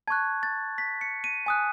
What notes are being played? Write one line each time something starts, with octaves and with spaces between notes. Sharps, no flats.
A5 C#6 F#6 G#6
A6
B6
C#7
D#7
G#5 D#6 F#6